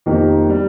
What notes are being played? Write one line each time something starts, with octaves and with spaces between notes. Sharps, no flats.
F2 D#3 A#3 D#4 G4
G3